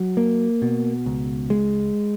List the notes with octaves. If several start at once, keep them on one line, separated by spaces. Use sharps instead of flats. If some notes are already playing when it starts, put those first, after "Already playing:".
Already playing: F#3
A#3
B2
C#2
G#3